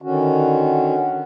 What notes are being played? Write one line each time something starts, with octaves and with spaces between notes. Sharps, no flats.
D3 D#3 C#4 F#4